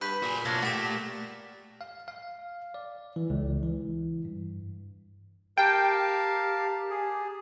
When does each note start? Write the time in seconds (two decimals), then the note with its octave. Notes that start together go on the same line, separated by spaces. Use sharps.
0.01 G2 B4 F#6 G6 B6
0.22 A#2 F#4 G#4
0.45 B2 A#3 C#4 D4 F4 F#6 A#6
0.62 A3 F#4 G4 A6 E7
1.81 F5
2.08 F5
2.74 D5
3.16 E3
3.30 C#2
3.63 E3
4.25 G2
5.58 G4 A#4 F5 G5 A5
6.90 G#4